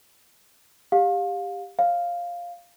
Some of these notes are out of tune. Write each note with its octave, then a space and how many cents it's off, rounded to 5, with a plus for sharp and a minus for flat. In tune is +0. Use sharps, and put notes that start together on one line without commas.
G4 +20 F5 +25
C#5 +0 F5 +0